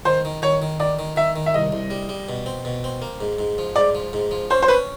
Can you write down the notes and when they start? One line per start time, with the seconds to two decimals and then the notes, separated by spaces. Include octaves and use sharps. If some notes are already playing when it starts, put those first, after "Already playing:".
0.05 D#3 C5
0.25 D#3
0.42 D#3 C#5
0.62 D#3
0.80 D#3 D5
0.99 D#3
1.16 D#3 E5
1.36 D#3
1.46 E5
1.54 C2 D#5
1.72 C2
1.90 G3
2.09 G3
2.29 B2
2.46 C4
2.65 B2
2.84 C4
3.02 A#3
3.21 G#2
3.39 G#2
3.58 F3
3.76 G#2 D5
3.95 F3
4.13 G#2
4.31 F3
4.50 C#4 C5
4.62 C5
4.68 C#4 B4